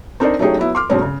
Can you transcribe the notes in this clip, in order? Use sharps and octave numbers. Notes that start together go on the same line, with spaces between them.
C4 D4 D#4 A#4 C5 D5
F#3 A3 C#4 D#4 G4 G#4
F#3 B3 E4
C6 D6 F6
G2 B2 F#3 G#3 C4 C#4
C#3